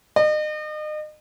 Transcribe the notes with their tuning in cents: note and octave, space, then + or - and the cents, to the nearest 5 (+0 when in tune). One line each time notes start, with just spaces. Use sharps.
D#5 -35